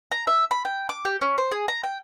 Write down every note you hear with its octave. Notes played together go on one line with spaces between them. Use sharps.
A#5
E5
B5
G5
D6
G4
C#4
C5
G#4
A#5
G5